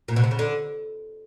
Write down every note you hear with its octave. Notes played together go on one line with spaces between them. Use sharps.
A#2
B2
C3
C#3
D3